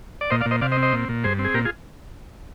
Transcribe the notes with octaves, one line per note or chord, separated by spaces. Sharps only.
D5
A#2 C5 D#5
D5 F5
A#2
C5 D#5
C3 D5 F5
C5 D#5
C4
C5 D#5
A#2
A#2
G2 G#4 C5
C4
G#4
A#2 G4 A#4
F4 G#4